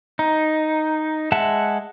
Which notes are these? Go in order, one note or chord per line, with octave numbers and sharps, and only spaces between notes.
D#4
G#3 E5 F#5 A5